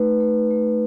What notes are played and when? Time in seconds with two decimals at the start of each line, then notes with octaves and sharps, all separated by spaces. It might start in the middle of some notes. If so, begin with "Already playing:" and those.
Already playing: A3 D#4 B4
0.20 A3
0.51 A3